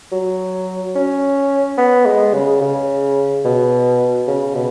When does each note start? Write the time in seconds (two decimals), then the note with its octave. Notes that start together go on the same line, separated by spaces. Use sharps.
0.12 F#3
0.96 C#4
1.78 B3
2.06 G#3
2.34 C#3
2.61 C#3
3.45 B2
4.28 C#3
4.55 B2